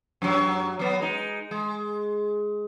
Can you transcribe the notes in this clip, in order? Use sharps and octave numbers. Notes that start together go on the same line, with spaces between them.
F#2 F#3
F#3 B3
G#3 D#4
G#3